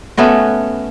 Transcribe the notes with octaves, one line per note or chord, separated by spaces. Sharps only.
A3 B3 C#4 F#4